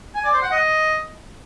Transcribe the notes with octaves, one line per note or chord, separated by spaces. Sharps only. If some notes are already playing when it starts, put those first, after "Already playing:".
G#5
D5
C5
F#5
D#5